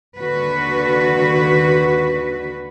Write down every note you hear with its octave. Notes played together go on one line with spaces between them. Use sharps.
D#2 D3 F#4 B4